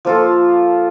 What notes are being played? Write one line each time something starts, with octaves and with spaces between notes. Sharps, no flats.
F3 A#3 F4 A4